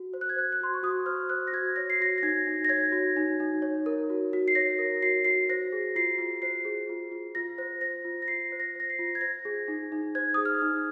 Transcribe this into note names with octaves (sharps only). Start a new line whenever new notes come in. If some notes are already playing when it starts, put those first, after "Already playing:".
Already playing: F#4
C5
F#6
G#6
C5 F#6
F#6
F#4 C6
C#6
F#4 D#6
C5 F6
C5 F#6
A#6
F#4 G#6
C#5 A#6
C7
F#4 A#6
A#6
D#4 G#6
D#4
A#6
C#5 G#6
F#4
D#4
D#4
C#5
A#4
F#4
F#4
C7
C#5 A#6
A#4
F#4 C7
F#4 C7
C5 A#6
G#4
F4 C7
F4
C5 C7
G#4
F4
F4
F4 A#6
C5
C5 A#6
F4
A#6
F4 C7
C5
A#6
C5 A#6
C7
F4
G#6
C5 A#6
G#4
D#4
D#4
C5 G#6
G#4 D#6
F6
D#4